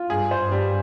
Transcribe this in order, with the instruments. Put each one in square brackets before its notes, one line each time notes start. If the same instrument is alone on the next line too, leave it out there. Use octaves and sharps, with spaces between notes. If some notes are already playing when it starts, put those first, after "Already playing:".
Already playing: [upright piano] F4
[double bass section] G2 [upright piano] G#4
[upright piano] C5
[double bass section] G2
[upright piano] G3